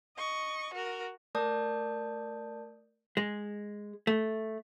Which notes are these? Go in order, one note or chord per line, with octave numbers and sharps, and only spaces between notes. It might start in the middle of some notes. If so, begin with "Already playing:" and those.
D#5 C#6
F#4 A#4
A3 A#4 D5 A5 D#6 G6
G#3
A3